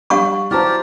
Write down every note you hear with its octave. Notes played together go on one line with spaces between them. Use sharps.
G3 D4 F5 F#5 C#6
E4 F#4 G4 C5 D5 A5 A#5 F6